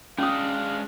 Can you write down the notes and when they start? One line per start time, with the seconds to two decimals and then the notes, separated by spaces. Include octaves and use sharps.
0.18 G#3 C#4 D4 F5 D#6